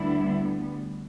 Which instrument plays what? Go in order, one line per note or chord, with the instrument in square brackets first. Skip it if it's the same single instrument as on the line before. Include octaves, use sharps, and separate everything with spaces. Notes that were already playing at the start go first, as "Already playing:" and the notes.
Already playing: [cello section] D2 D3 G3 B3 D4 E4